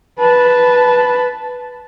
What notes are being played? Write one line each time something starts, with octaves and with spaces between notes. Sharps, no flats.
B4 A5